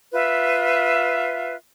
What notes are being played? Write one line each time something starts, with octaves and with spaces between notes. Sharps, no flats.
F4 B4 E5